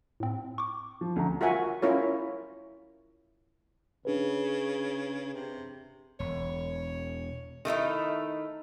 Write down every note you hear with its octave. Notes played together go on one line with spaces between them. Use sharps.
A2 C4
C#6 D6
F3
D2 A#5
F4 F#4 A#4 E5 F#5 G#5
C#4 E4 F4 A#4 C#5
C#3 D4 G#4 B4
C3
E1 C#5
D#3 A3 D#4 E4